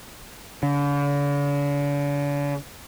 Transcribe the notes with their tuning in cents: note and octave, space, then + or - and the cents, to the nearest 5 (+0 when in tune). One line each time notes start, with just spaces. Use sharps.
D3 -45